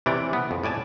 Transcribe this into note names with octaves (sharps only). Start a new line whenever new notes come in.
C3 E3 C#5 D5
B3
F2
A2 D5 G#5 A5